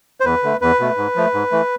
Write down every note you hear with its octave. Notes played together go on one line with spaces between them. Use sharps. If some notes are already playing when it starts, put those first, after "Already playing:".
C5
E2 B4
D3 A3
E2 B4
B2 A3
G#2
F3 A3
G#2
E3 A3